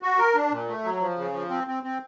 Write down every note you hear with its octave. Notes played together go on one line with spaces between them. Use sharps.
F#4
A#4
D4
A#2
A3
F#3
F3
C#3
F3
C4
C4
C4